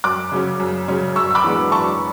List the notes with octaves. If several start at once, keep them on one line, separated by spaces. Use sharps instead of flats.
F#2 D6 F#6
C#3 F#3 C#4
F#2
C#3 F#3 C#4
F#2 C#6 E6
E6
B5 D6
E3 G#3 B3 D4
F#2 A5 C#6